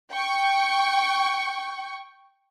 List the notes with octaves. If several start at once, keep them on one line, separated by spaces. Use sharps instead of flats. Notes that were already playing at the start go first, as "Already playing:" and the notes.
G5 C#6